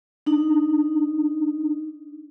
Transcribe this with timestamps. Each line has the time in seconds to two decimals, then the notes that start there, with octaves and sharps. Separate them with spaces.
0.26 D4 D#4